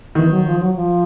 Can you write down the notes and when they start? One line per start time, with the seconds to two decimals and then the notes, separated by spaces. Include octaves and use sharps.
0.15 D#3 E3
0.30 F#3
0.46 F3
0.60 F#3
0.76 F3